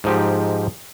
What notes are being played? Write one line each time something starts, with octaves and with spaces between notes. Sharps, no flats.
G#2 F3 D#4 G4